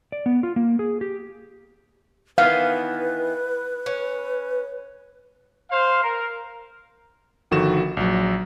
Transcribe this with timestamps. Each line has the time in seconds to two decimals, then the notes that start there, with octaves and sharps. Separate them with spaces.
0.12 D5
0.26 B3
0.43 F4
0.56 A#3
0.79 G#4
1.01 G4
2.38 D#3 E3 B3 B4 F5
3.86 C#4
5.70 C5 F5
6.03 A#4
7.51 G1 D#3 F3 F#4 A4 E7
7.97 A#1 F#3